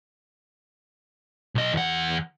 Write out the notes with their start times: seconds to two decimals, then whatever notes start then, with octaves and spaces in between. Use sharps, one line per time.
1.55 B1 D#5
1.73 E2 F#5